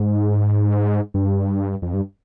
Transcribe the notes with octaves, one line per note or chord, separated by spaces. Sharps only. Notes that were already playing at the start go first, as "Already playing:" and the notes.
Already playing: G#2
G2
F2
G2